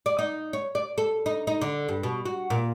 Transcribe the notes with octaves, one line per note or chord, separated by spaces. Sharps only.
D5
D#4
C#5
D5
A4
D#4
D#4
D3
G2
B2
F#4
A#2